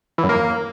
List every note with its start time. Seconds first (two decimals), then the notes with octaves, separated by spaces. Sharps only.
0.18 E3
0.24 F#2
0.29 A#3